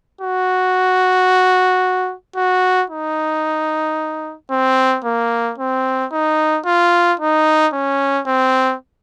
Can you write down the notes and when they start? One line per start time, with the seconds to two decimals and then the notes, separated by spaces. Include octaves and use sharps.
0.21 F#4
2.36 F#4
2.90 D#4
4.51 C4
5.04 A#3
5.58 C4
6.12 D#4
6.66 F4
7.20 D#4
7.73 C#4
8.27 C4